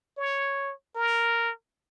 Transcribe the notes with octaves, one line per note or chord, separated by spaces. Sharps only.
C#5
A#4